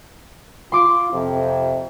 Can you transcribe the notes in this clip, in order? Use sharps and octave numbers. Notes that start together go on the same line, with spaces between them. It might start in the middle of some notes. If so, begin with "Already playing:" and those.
F4 C6 D6 D7
F2 C3